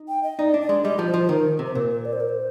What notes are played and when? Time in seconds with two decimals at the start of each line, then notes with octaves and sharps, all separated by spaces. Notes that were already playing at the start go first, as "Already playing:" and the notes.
Already playing: D#4
0.08 G5
0.23 D#5
0.39 D#4 D5
0.54 D4
0.61 D5
0.69 G#3
0.84 G3 D#5
0.99 F3
1.07 C5
1.14 F3
1.23 C5
1.29 D#3 A#4
1.59 C3
1.66 C5
1.74 A#2 A#4
1.90 A#4
2.05 D5
2.13 C5
2.20 A#4
2.29 C5